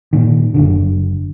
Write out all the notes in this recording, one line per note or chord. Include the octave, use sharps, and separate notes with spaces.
A#2 D#3
F#1 B1 D3